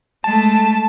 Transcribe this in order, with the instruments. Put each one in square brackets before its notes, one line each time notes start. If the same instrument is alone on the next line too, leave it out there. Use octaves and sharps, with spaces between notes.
[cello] G#3 A3 [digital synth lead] A5